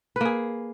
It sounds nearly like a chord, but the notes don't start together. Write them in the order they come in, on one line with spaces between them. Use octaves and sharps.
B4 A#3 G#4